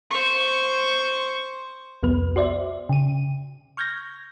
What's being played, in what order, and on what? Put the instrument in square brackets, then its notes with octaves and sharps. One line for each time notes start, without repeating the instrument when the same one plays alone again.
[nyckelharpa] C5 C#6
[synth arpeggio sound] C2 F2 B3 B4
F#4 C5 D5 E5
C#3 D#7
C#6 F6 G6 G#6 A#6